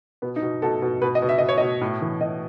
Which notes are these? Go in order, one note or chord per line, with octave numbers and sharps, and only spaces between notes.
B2 B3
D#4
B2
B2 A4
B2
B2 B4
D#5
B2
E5
B2 D#5
C#5
B2 D#5
A2
E3
A2 D#5